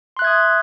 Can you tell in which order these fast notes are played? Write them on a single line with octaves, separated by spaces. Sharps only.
C6 F#6 E5 G#6 D#6